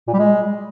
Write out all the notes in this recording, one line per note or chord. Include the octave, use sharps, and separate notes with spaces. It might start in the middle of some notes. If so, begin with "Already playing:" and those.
A#2
G3
G#3